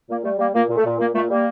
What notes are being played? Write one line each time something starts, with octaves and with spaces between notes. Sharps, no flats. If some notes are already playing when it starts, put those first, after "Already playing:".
A#2 A#3
G3 A3
G3 A#3
A#2 A#3
A#2
A3
A#2
A#2 A#3
A#2 A3
G3 A#3